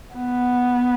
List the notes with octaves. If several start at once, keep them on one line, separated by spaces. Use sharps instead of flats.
B3